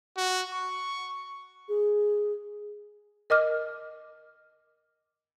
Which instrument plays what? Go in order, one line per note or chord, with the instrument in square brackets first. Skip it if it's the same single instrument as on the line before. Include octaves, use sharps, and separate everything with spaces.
[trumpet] F#4
C#6
[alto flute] G#4
[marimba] A#4 D#5 D6 F6